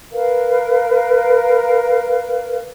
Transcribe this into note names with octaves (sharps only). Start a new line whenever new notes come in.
A#4 B4 F5